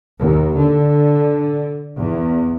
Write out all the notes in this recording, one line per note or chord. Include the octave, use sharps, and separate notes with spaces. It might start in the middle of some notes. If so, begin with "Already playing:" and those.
D#2
D3
E2